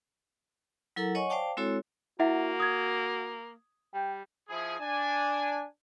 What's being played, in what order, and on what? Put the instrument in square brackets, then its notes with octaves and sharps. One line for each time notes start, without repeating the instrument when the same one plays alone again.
[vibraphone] F#3 E4 A4 A#4 F#5 A#5
C#5 D#5 F#5 G#5 C#6
C5 D5 F5 G5 A5 D6
G#3 C4 E4 F#4 A4 C#5
[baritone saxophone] A#3 [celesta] E4 E5 F#5 [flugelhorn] F#4
[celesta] D#6 G#6
[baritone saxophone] G3 [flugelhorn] G5
[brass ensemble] F3 E4 G#4
D4 G#5